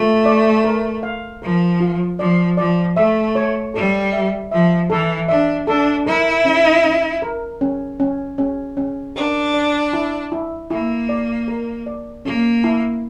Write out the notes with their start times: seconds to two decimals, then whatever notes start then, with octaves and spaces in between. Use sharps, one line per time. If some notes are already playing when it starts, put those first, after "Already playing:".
Already playing: A3 F4
0.25 D5
0.64 A#4
1.03 F5
1.42 F3 A#4
1.80 F4
2.19 F3 D5
2.57 F3 D5
2.96 A3 E5
3.35 C#5
3.74 G3 A4
4.13 E5
4.51 F3 E5
4.90 E3 A4
5.28 D4 E5
5.67 D4 A4
6.06 E4 A#4
6.45 C#4
6.84 C#4
7.22 A#4
7.61 C#4
8.00 C#4
8.38 C#4
8.77 C#4
9.15 D4 A#4
9.54 D5
9.93 E4
10.32 E4
10.70 A#3 E4
11.09 D5
11.48 A#4
11.86 D5
12.25 A#3 C#4
12.64 E4